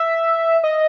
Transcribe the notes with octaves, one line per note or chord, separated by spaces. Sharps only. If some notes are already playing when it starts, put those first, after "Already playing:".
Already playing: E5
D#5